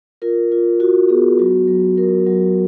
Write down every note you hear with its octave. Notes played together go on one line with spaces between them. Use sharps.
F4 A#4
F4
F4 F#4
B3 G#4
F#3 F#4
F#3
F#3 A#4
F#3